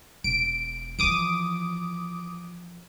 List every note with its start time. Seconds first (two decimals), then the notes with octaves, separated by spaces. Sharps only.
0.24 E1 D7
0.99 E3 F3 D6 D#6 D7